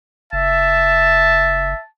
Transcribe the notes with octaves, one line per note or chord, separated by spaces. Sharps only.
F#1 E5 A5